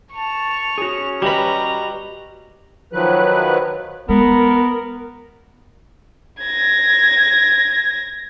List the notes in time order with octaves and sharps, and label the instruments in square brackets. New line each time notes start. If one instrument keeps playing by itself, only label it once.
[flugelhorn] A5 [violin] C#6 F7
[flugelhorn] C#4 [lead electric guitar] F#4 G#4
[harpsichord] G3 B4 [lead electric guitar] F#4 D#5 [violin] A#5
[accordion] D#3 F3 F#3 B4 F#6
[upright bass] G#3 A#3 [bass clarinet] B3 [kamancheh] A#4
[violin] G#6 A#6